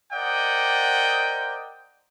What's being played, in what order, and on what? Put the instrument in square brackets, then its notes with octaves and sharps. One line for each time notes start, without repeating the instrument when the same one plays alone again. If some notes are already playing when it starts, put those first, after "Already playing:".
[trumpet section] A#4 C5 D5 D#5 F#5 G5